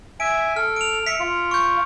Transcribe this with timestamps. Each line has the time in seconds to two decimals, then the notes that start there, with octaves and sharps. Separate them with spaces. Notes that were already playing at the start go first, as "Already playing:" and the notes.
0.20 E5 G#5 D7
0.56 A4 F6
0.76 D7 F7
1.07 E5 B6 C#7
1.20 F4
1.51 C#6 G6